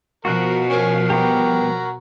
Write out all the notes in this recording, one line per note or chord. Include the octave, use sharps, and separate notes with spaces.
B2 F3 F#4 A#4 F#6
C#4 A#4 G#5
G3 B3 F#4 G4 A#5